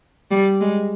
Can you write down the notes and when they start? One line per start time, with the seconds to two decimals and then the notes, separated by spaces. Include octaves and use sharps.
0.31 G3
0.61 G#3